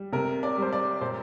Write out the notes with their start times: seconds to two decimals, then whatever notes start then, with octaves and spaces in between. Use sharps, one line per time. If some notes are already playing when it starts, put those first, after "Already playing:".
Already playing: G3
0.12 C3 A#4
0.43 D5
0.58 G3 C5
0.73 D5
1.01 A#2 C5